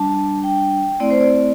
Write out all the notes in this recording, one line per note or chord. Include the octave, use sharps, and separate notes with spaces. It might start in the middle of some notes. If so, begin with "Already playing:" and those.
Already playing: G3 D4 A5
G5
A3 C4 E4 D5
C5
D5